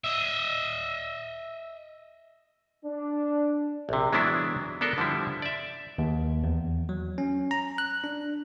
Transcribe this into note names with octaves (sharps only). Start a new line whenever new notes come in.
D#5 E5
D4
A#1 C3
E3 F#3 G#3 B3 D4 E4
B3 D4 A4 A#4
D3 F3 G3 E4
D5 E5
D#2
E2
F#3
C#4
A#5
F#6
D4